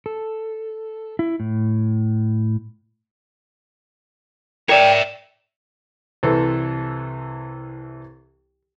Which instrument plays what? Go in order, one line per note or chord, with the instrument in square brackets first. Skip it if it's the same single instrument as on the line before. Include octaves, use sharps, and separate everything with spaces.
[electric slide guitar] A4
E4
A2
[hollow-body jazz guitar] A#4 D5 [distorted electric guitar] C#5 E5 [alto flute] G5
[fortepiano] C2 E3 A4 C5